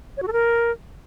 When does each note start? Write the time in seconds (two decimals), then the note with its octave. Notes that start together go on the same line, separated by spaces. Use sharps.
0.17 C#5
0.22 F#4
0.27 A4
0.33 A#4